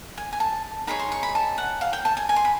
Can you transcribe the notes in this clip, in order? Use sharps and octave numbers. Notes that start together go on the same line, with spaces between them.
G#5
G#5
A5
D#4 G#4 C#5 B5
C6
C#6
B5
A5
F#5
F5
G5
A5
G#5
G#5
C6
B5